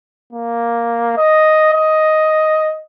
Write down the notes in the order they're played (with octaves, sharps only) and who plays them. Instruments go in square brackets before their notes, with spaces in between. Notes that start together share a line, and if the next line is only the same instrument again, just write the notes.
[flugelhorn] A#3
D#5
D#5